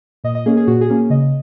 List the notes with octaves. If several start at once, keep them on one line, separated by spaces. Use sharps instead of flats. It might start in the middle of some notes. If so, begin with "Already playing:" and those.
A#2 D#5
D#5
A#3 C#4 G#4
G#4
A#2 F#4
G#4
A#3 C#4
C#3 D#5